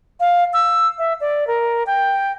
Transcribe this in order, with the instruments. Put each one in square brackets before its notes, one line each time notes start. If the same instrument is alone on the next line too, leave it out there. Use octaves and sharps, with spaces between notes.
[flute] F5
E6
E5
D5
A#4
G5